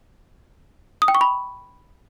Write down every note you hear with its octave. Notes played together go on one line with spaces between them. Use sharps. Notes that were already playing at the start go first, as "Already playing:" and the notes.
D#6
G5
C#6
B5